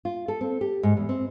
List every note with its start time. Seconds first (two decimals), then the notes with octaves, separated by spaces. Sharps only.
0.05 F4
0.28 A4
0.41 C4
0.61 G4
0.83 G#2
0.97 E2
1.09 C4